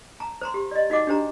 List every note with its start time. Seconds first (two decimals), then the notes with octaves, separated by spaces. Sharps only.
0.20 A5 A#5
0.41 C5 A#5 C6
0.54 G4
0.71 D5 D#5
0.90 D#4 F#4 D#5 F#5 D6
1.07 D4 G4 C5 A#5